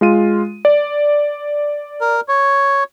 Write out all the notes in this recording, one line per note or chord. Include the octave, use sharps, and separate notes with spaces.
G#3 F4 D#7
D5
A#4
C#5